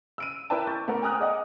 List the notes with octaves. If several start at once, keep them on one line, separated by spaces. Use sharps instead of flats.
E6 D7 D#7
E4 A#4 B4 D5 G5 A5
C#6 D6 G6 A6
A3 B3 A#4
G5 G#5 A#5 D#6 F6 F#6
G#4 D5 D#5 F#5 G#5